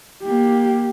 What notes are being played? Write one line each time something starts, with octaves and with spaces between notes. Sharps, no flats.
A#3 G4